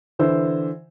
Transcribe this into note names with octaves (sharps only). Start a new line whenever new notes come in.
D3 E3 C5 E6